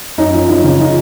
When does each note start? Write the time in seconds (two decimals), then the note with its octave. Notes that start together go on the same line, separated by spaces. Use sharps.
0.18 F#2 D#4
0.33 F3
0.49 F#2 D#4
0.64 C#3
0.80 F3 D#4